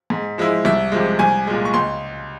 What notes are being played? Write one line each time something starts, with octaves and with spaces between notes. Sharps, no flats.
G#2
F3 G#3 E4
C2 E5
C3 F3 G#3
C2 G#5
A#2 G#3
C#6
C#2 C6